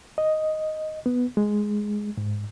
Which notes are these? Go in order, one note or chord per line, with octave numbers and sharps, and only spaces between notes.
D#5
B3
G#3
G#2